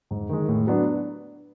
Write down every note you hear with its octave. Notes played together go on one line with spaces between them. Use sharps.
G#2
D#3 G#3
A2
F#3 B3 D4